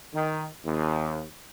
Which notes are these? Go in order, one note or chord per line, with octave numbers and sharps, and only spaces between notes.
D#3
D#2